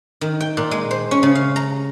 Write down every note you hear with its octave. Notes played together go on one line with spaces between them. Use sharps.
D#3
G5
A#2
G#3
C5
C#4
C#3
F5
A#5